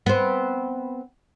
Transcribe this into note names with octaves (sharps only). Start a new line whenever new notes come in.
B3 C4